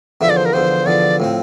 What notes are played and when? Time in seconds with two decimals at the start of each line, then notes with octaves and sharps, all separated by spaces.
0.21 E2 D3 F3 E5
0.30 D5
0.37 C5
0.45 A#4
0.53 E2 D3 F3 C5
0.86 E2 D3 F3 D5
1.20 A2 F3 C4